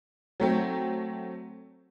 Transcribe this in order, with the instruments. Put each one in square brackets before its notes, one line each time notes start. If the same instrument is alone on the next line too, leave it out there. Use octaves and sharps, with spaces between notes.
[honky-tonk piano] F#3 A3 C4